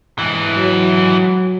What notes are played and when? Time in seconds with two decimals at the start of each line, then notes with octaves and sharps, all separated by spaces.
0.19 G#2 E3
0.55 F#3